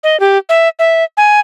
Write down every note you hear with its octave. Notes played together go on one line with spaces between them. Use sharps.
D#5
G4
E5
E5
G#5